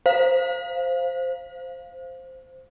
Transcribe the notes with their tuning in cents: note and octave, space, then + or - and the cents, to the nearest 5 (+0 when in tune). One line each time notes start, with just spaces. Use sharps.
C5 +0 F5 +0